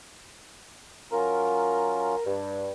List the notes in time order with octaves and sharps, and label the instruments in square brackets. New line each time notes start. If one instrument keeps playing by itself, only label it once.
[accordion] F#3 C#4 F4 [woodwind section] A#4
[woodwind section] G2